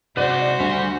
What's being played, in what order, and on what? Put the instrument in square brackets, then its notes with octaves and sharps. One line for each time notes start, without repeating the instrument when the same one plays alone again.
[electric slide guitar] C3 G#3 [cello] F#4 [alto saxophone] C5 [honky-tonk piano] D5
[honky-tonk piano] D2 [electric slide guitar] G3